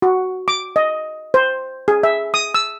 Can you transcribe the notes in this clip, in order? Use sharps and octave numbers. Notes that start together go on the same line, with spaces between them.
F#4
D6
D#5
C5
G#4
E5
D#6
E6